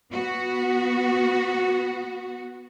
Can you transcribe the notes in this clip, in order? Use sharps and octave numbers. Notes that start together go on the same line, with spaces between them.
B3 F#4